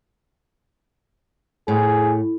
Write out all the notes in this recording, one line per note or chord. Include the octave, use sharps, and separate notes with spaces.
A2 G#4